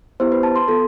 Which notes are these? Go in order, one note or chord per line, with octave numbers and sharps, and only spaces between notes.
B3 E4 G4 C5
B4
A5
C6
B3 F4 A4